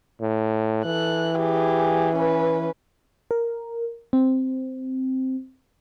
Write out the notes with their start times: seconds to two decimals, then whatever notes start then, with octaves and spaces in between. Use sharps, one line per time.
0.21 A2
0.85 E3 A4 F#6
1.36 G4 G#4
2.16 C#4 B4
3.31 A#4
4.13 C4